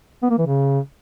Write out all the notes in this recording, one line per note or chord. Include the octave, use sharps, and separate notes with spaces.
B3
A#3
E3
C#3